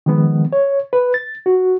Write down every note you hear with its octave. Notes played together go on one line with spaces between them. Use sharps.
D#3 F3 G#3 B3
C#5
B4
A6
F#4